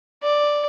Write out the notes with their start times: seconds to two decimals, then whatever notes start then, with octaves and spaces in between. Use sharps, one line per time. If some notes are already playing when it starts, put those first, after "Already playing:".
0.23 D5